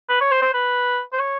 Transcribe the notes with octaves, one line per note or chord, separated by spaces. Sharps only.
B4
C#5
C5
C5
B4
C5
C#5